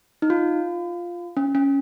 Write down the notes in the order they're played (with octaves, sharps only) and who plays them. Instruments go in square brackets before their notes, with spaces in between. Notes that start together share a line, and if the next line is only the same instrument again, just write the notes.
[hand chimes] D#4
F4
C#4
C#4